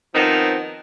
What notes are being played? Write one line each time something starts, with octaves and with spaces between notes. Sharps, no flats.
D#3 F3 B3 C4 D#4